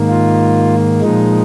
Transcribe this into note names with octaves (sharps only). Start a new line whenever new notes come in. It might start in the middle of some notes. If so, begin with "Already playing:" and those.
Already playing: G#2 D#3 A#3
F4
A#2 F3 G#3 D#4